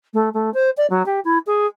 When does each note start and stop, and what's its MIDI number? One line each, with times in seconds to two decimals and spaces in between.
0.13 0.29 57
0.34 0.52 57
0.54 0.70 72
0.77 0.87 74
0.90 1.03 54
1.06 1.20 67
1.24 1.38 64
1.46 1.66 68